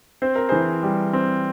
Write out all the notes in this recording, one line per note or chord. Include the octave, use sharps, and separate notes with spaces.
C4 C5
A#4
E3 G#4 C5
G3
C4